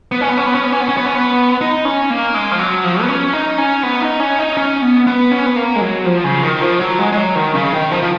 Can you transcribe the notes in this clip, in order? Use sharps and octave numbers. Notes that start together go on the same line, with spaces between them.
B3
C#4
B3
C#4
B3
C#4
B3
C#4
B3
C#4
B3
C#4
B3
D#4
C#4
A#3
G#3
F3
F#3
F3
B3
C#4
D#4
C#4
B3
D#4
C#4
D#4
C#4
B3
B3
C#4
B3
A#3
G#3
F#3
F3
C#3
D#3
F3
F#3
G#3
G#3
F#3
D#3
C#3
D#3
F3
F3